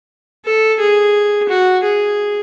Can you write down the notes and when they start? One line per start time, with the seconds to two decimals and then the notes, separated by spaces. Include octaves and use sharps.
0.45 A4
0.80 G#4
1.49 F#4
1.83 G#4